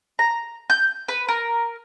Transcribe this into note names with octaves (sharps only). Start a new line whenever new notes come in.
A#5
G6
B4
A#4